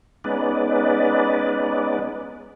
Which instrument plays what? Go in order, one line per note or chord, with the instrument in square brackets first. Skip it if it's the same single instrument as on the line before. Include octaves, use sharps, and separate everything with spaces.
[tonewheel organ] G#3 B3 C#4 D#4 B4 D5